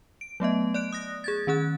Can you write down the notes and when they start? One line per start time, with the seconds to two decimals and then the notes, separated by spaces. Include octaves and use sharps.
0.21 D7
0.40 F#3 A3 B3 D#5
0.74 D5 F#6 D7
0.93 D#6 F#6 A#6
1.24 G#4 G#6 A6
1.47 D#3 C#4 G#4 F#6